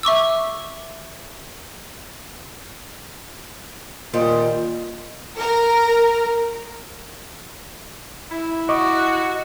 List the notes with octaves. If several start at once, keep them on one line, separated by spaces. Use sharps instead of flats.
E5 C#6 D6 E6
A#2 D#3 G3 C5
A#4
E4
F#4 D#5 C#6 D6